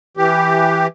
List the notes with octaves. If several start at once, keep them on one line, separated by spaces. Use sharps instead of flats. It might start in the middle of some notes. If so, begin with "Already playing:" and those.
E3 G4